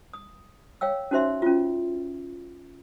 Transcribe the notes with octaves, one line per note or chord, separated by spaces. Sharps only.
D#6
C#5 F5 G5 E6
C#4 D#4 F#4 C5 E5 C6
C#4 F4